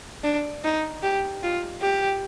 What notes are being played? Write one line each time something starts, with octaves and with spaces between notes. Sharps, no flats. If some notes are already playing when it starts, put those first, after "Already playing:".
D4
D#4
G4
F4
G4